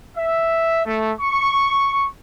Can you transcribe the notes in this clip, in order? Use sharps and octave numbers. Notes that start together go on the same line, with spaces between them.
E5
A3
C#6